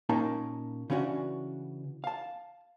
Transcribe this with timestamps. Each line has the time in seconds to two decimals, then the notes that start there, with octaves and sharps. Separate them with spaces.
0.09 A#2 A#3 C#4 D#4 A5 A#5
0.90 C#3 E3 C#4 D4 F#4
2.04 F5 A5